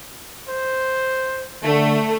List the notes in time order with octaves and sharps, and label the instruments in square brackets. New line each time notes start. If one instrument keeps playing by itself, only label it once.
[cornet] C5
[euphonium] D3 [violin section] A3